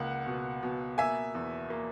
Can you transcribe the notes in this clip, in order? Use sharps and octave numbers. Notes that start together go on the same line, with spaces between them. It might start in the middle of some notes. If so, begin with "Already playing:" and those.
Already playing: C#2 A#3 F#5
B2
B2
A#3 E5 G#5
E2
A#3